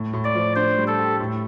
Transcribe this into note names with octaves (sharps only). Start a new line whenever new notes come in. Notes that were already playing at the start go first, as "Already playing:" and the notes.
Already playing: A2
A2
D5
F3
D4 C5
G3
A4
G4
A2